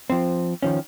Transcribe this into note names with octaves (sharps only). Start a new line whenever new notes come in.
F3 C4
D#3 F3 C#4